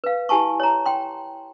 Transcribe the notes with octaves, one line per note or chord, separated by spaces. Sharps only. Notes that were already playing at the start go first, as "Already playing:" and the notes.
B4 F5
E4 G4 G#5 A5 C#6
C#5 A#5
G5 C6